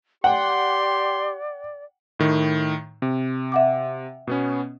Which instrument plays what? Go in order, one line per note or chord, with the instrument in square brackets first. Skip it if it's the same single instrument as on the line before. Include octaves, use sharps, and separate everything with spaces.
[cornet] G4 [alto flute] D5 [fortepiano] F#5 G5 [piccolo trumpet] C6
[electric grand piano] A2 D#3
C3
[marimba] E5 F#5 D6
[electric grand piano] B2 B3 C#4